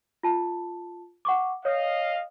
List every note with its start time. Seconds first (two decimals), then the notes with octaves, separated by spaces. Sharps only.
0.23 F4 A5
1.25 F#5 C#6 D6
1.65 C#5 D#5 F5